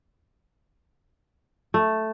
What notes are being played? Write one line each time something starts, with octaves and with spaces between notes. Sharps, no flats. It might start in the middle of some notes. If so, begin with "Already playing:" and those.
A3